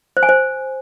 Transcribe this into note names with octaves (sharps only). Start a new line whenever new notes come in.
C5
G#5
C5